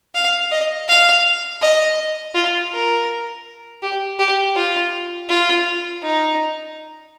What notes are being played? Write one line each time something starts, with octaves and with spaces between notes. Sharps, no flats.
F5
D#5
F5
D#5
F4
A#4
G4
G4
F4
F4
D#4